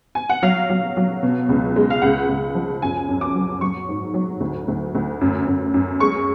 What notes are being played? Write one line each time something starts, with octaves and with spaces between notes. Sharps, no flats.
G#5
F#5
F#3 F5
F#3
F#3
B2
C#2
G#3
F5
C#2 F#5
C#2
F3
F#2 G#5
F#2
D6
F#3
F#3 C#6
G#2
F#3
D2
D2
D2
F#2
F#2
F#2
G#3 C#6